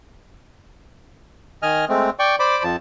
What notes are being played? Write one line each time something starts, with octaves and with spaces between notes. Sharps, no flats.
D#3 D#5 G#5 F6
G#3 A3 C4
D5 G5 C#6
C5 D5 B5 D6
F2 F3 A5